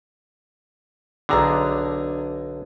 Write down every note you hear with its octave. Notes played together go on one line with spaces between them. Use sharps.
B1 D3 D4 G#4 A#5